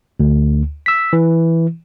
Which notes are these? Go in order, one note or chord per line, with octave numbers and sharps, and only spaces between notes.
D2
E6 B6
E3